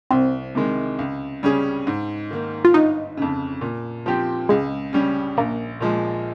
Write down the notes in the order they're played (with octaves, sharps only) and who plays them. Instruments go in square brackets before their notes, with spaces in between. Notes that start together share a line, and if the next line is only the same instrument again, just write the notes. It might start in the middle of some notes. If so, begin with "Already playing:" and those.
[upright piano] C2 [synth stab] C4
[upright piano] C3 D#3 G#3
C#2
C#3 G3 C#4 G#4
G#2
D#3 A#3
[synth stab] F4
[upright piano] G1 [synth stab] D#4
[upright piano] F2 C#3
A#2
F3 C4 G4
[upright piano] C#2 [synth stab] G#3
[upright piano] C#3 G3 C#4
[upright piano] A#1 [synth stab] A#3
[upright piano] A#2 F3 G#3